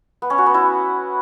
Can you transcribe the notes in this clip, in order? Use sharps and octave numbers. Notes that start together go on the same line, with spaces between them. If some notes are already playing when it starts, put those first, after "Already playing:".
B3
C#4
F#4
B3
E4